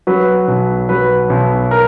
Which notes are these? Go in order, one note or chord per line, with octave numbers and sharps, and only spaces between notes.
F#3 B4
B1
F#3 B4
B1
A#4